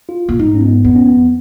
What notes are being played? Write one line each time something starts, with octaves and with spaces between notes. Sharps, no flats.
F4
A#2
G#2 D#4
C#4
B3
F2 B3
C#4
B3